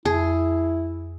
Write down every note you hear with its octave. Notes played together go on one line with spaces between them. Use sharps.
F2 E4 G#4